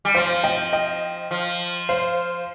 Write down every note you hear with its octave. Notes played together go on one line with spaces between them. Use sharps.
G3
F3 C5 F5
D#5 G5
D#5 G5
F3
C5 F5